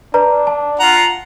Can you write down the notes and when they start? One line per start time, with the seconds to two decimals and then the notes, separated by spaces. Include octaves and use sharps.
0.14 D4 B4 D5 A#5
0.47 A5
0.80 F4 F#5 A#5